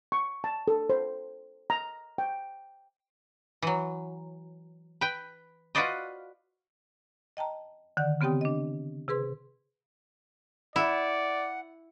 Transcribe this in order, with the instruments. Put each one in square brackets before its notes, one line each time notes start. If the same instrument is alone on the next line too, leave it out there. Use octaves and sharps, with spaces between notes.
[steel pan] C#6
A5
A4
C5
A#5
G5
[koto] E3 F#3
B4 G5
F4 F#4 B4 C5 D5 D#5
[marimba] D#5 G5 A5 A#5
D3 D#3 D5 F#5
C#3 B3 C4 G4 G5 D#6
D4 D#5
C3 G#4 B4 C6
[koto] E4 [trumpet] D5 [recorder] F#5